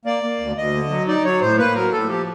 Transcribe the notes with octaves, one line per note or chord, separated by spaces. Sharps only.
A#3 D5
A#3
D2
D2 D#5
D3
F#3
D#4 D5
F#3 C#5
A2 C5
A#3 B4
F#3 A#4
A2 A4
F3 G4